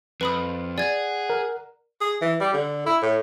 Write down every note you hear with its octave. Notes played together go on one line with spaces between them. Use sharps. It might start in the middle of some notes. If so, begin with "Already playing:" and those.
F2 B4 B5 D#6
G#4 D5 F#5 G#6
A#4
G#4
E3
G3
D3
E4
A2